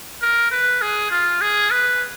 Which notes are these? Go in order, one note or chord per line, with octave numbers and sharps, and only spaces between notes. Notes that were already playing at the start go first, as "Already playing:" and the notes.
A#4
B4
G#4
F4
G#4
B4